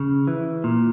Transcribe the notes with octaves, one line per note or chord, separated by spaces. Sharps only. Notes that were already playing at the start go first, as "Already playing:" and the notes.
Already playing: C#3
E3
A#2